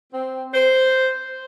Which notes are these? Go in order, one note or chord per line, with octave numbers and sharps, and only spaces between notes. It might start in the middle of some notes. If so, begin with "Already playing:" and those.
C4
C5